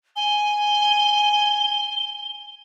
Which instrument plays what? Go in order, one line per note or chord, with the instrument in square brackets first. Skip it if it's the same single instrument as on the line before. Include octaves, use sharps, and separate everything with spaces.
[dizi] G#5 [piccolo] G7